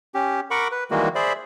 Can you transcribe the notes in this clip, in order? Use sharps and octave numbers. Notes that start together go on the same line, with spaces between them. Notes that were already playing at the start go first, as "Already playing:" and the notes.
C#4 G4
A#4 F#5 B5 C#6 D6
B4
D#3 E3 G3 G#3 A#3 F#4
G#4 C5 D5 E5 B5